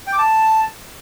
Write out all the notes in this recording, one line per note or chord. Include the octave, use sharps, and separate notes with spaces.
G5
D6
A5